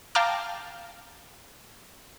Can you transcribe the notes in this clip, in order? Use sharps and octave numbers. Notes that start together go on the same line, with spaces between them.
F5 G5 A5 A#5 D6 F6